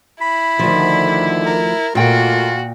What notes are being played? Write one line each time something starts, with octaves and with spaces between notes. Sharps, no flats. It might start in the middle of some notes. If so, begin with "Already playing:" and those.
E4 B5
D2 D3 D#3 F3
A#4
A#2 A3 A#3 F4 F#4 G5